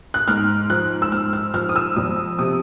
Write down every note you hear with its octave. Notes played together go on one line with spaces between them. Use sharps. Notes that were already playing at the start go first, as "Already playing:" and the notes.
F#6
G#2 F6
F3 F#6
E6
G#2 F6
F6
F3 F6
D#6
E6
F2 D#6
C3 D#6